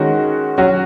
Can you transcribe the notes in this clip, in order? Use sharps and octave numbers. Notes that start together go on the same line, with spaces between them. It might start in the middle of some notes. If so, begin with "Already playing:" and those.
Already playing: D#3 G#3 C#4 F#4
F#3 C#4 F#4